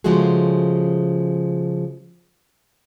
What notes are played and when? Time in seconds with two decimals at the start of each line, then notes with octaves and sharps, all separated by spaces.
0.04 C#3 F3 G#3 A3 F#4 G#4